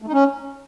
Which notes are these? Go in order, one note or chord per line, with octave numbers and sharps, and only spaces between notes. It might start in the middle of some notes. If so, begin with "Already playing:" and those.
A3
D#4
C#4